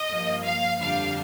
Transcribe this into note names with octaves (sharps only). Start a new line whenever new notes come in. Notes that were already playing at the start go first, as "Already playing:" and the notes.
Already playing: D#5
G2 F3 A#3
F5
F2 D3 G3 D4 F5